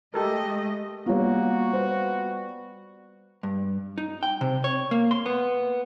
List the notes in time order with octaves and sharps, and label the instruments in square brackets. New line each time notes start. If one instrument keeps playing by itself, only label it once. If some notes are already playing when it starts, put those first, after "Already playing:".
[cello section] G#3 A3 D#5 [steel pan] G4 A4 A#4
[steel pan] G3 B3 [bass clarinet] A#3 [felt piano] F4 C#5 [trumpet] F#4
[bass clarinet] G3 [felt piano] B3 [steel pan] C5
[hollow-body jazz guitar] G2
D#4
G5
C3
C#5
A#3
C6
B3